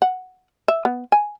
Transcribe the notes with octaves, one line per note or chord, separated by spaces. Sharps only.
F#5
E5
B3
G#5